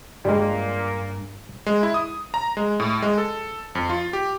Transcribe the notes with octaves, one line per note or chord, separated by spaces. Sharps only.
G2 A#2 G3 G#3 A#3
G#3
E4
D#6
A#5
G#3
A2
G#3
A4
F2
F4
G4